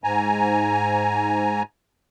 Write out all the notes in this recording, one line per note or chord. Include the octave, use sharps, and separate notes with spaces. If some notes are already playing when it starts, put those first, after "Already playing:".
G#2 G#5 A#5